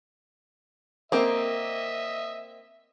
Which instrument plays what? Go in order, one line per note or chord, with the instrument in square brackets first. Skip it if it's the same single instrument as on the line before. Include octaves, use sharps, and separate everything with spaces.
[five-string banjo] A#3 C4 [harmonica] D#5 E5